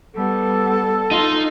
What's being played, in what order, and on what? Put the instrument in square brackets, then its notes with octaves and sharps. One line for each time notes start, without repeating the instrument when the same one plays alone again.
[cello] G3 B3 [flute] A4
[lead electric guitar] D#4 [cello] F4